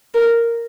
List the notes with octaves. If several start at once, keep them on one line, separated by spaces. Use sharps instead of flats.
A#4